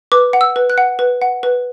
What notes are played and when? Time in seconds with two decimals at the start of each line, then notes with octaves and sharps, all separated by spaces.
0.12 B4 D6
0.33 F#5
0.41 E6
0.56 B4
0.70 F#6
0.78 F#5
0.99 B4
1.22 F#5
1.43 B4